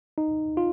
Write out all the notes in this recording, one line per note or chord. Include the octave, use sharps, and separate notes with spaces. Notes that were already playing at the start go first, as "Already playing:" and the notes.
D#4
F4